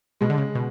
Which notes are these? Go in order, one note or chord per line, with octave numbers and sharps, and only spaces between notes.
B2 G#3
D3
C#3
B2